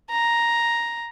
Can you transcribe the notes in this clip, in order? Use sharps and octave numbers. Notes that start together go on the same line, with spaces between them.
A#5